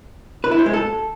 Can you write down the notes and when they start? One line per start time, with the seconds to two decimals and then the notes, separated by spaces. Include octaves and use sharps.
0.44 B4
0.51 E4
0.59 C5
0.66 G#3
0.73 A4